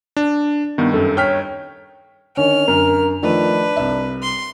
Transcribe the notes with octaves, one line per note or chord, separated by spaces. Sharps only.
D4
G2 D#3 B3
F#2 A4
C#5 G5 F6 B6
D3 D#3 C#4 F6
F#2 D3 A#4
D#3 F3 A3 D4 B4
C2 E5
C6